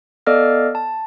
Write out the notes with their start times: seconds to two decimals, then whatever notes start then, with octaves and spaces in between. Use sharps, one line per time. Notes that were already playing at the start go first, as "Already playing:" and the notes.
0.27 B3 A4 D5 D#5 F5 F6
0.75 A5